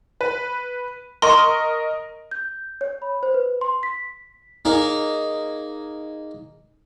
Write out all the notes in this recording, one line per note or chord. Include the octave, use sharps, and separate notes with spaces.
B4
A#4 D#5 C6 C#6
G6
C#5
B5
C5
B4
C6
B6
A#3 D#4 G#4 A#4 C#5